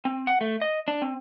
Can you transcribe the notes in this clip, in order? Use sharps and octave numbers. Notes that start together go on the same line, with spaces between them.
C4
F#5
A3
D#5
D4
C4